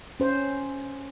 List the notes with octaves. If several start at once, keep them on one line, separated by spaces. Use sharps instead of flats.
C#4 C5